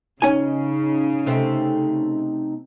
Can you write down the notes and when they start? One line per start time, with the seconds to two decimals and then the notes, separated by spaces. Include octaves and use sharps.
0.22 C#3 C#4 D#4 G#5
1.26 C3 A3 C4